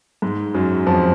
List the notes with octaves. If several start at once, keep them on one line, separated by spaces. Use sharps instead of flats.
G#2 G#3
F#2 F#3
F2 F3